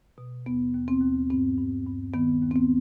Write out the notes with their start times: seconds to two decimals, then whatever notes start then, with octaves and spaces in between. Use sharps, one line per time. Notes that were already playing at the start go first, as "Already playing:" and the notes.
0.18 B2
0.46 D#2 B3
0.74 D#2
0.88 C4
1.02 D#2
1.30 G2 C4
1.57 G2
1.86 G2
2.14 D#3 B3
2.42 D#2
2.51 C4
2.56 B3